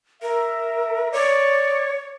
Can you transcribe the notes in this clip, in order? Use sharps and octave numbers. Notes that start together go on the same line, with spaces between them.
A#4 E5
C#5 D5